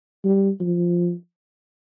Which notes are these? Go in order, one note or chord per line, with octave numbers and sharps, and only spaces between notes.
G3
F3